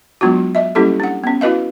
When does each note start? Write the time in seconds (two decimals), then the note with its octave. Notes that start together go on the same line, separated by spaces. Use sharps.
0.21 F#3 G#3 B3 D4 F4 F#4
0.55 D#5 E5
0.75 G3 A#3 C#4 E4 G4 A4
1.00 D4 F#5
1.24 B3 C#4
1.41 E4 F#4 B4 D#5 F5